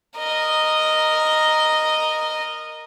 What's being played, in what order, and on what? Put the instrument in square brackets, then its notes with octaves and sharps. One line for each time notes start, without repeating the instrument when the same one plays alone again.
[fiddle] A#4 D#5